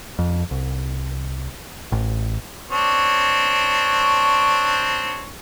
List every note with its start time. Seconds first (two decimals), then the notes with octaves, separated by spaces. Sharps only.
0.19 F2
0.51 C2
1.92 A1
2.70 C4 D4 C#5